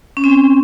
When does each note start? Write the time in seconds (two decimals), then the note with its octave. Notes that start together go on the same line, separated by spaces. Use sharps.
0.17 C#4
0.24 C4